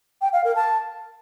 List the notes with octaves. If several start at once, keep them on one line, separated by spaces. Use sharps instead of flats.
G5
F5
A#4
A5